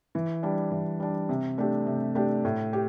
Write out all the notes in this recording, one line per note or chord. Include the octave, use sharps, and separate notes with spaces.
E3
G3 D4
E3
G3 D4
C3
A3 D4 G4
C3
A3 D4 G4
A2
G4